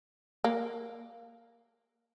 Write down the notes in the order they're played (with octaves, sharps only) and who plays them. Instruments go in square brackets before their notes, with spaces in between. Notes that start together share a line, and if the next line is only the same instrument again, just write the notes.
[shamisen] A#3